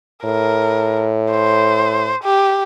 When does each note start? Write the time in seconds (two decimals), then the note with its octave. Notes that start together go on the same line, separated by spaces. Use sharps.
0.25 A2 A#4
1.32 C5
2.24 G4